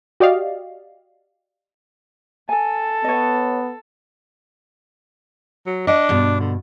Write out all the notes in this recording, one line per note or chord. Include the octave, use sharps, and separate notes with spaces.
F#4 G4 D5 D#5 F5
A4 G#5
B3 C#5 D#5
F#3
D4 D#5 F#5
G2 B2
D3